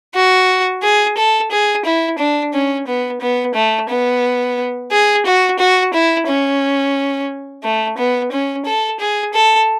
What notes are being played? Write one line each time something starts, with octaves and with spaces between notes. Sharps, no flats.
F#4
G#4
A4
G#4
E4
D4
C#4
B3
B3
A3
B3
G#4
F#4
F#4
E4
C#4
A3
B3
C#4
A4
G#4
A4